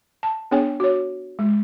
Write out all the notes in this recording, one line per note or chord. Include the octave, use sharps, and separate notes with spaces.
A5
B3 D4 G#4 C#5 G5 G#5
F#4 C#5
G#3